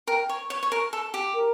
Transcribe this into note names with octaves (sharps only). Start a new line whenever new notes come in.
A#4 G5
C#5
C#5
C#5
A#4
A4
G4
A#4